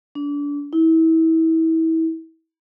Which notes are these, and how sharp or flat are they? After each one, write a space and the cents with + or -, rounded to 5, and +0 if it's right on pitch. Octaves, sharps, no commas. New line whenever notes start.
D4 -30
E4 -30